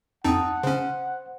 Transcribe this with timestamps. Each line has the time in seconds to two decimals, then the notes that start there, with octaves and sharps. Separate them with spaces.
0.25 F2 C4 D#4 F#5 A5 D#6
0.63 C#3 C#4 C5